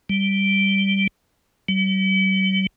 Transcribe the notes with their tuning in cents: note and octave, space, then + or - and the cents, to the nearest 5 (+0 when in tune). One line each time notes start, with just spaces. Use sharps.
G3 -5
G3 -45